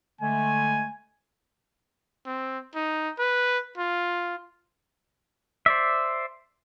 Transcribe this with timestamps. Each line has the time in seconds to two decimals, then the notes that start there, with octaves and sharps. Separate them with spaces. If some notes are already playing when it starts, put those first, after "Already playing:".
0.21 D3 G#3 A3 G#5
2.26 C4
2.75 D#4
3.19 B4
3.78 F4
5.66 C5 D5 E5